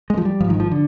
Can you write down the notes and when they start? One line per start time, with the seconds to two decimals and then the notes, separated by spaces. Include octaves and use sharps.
0.10 G#3
0.18 F3
0.25 G3
0.40 G#1 G#2 F3
0.50 D#3
0.60 F3
0.72 D3